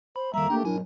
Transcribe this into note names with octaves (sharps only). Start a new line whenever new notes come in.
C5 B5
F2 D#3 G3 A#3 E5 A#5
A3 A#3 D4 G4 G5
G#2 B2 F#3 D4 E4 A#4 G#5